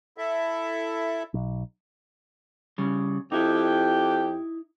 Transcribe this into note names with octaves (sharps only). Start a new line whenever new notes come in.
E4 A4 E5
B1
C#3 G3
F2 D#4 E4 G4